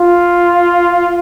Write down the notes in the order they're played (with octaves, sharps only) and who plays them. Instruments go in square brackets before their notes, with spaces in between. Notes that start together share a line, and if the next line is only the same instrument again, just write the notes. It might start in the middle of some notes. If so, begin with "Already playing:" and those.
Already playing: [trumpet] F4